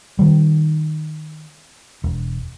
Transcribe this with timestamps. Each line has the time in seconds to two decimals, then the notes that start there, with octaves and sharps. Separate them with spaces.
0.19 D#3 G3
2.04 E1